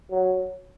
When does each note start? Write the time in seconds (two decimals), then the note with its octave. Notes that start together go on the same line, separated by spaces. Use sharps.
0.11 F#3